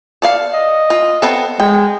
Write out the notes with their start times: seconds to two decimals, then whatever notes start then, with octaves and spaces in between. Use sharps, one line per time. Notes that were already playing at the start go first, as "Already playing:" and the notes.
0.22 A4 D5 F5
0.53 D#5
0.90 F4
1.22 B3 C4 A4
1.60 G#3 G5